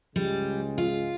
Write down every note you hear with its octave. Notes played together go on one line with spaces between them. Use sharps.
C#2 C#3 G3 G#3
F4